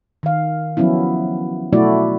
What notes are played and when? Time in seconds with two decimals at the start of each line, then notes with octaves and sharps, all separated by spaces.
0.23 D#3 F5
0.77 F3 F#3 B3 C#4 E4
1.73 B2 F#3 A3 E4 F#4 D5